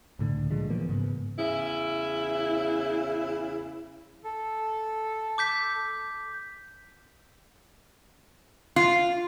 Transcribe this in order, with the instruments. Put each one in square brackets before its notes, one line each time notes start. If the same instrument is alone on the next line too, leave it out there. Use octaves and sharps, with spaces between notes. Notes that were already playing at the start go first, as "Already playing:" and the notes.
[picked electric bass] C#2 A2 D3
A#2 D3 F3 G#3
E3 F3 A#3 B3
G#2 C#3 B3
[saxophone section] E2 C#3 E4
[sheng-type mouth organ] A4
[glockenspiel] D6 G6 B6
[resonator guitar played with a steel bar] F4